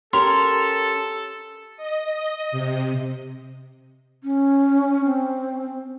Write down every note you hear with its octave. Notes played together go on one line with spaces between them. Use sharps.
C#4 G4 A4 A#4 C6
D#5
C3
C#4
C4